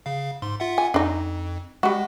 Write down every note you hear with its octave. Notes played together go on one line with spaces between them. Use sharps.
C#3 F5
G#2 C6
F4 E5 F#5
G#5
F2 D4 D#4
G3 G#3 F#4